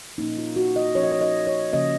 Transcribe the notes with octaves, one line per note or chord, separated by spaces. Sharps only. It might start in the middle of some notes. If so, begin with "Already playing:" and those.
A#2 F3 A#3 C#4 D#4
F4
F#4
D#5
F3 A#3 C#4 C#5
D#5
C#5
D#5
C#5
C#3 F3 A#3 C#4 D#5